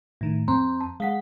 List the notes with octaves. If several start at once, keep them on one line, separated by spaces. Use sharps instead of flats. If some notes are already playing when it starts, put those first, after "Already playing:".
A2 D#3
F2 C4 A#5 C6
A5
G#3 F5 F#5 B6